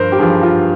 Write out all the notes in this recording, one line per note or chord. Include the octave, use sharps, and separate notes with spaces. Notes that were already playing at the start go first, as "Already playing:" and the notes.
Already playing: G2 F3 A#4 C5
G4
G2 F3 G#4
F4